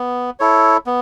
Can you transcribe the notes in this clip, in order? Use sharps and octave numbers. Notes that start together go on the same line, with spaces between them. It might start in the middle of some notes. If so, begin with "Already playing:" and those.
Already playing: B3
E4 A4 C#5
B3